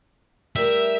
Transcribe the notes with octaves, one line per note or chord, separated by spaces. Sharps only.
G3 A3 A#4 E5